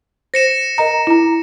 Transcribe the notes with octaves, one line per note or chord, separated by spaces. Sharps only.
C5 A#6 C#7 E7
A#4 D#5 A#5
E4 A#5